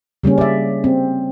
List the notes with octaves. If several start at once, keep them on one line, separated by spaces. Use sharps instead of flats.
C#3 G3 A#3 C#4
D5 E5
C4